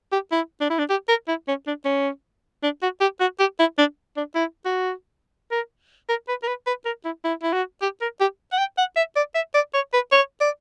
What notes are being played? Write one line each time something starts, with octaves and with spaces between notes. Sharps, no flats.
G4
E4
D4
E4
D4
G4
A#4
E4
C#4
D4
C#4
D4
F#4
G4
F#4
G4
E4
D4
D4
E4
F#4
A#4
A#4
B4
A#4
B4
B4
A#4
E4
E4
E4
F#4
G4
A#4
G4
F#5
G5
F#5
E5
D5
E5
D5
C#5
B4
C#5
D5